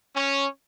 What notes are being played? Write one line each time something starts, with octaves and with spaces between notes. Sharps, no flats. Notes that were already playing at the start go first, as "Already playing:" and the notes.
C#4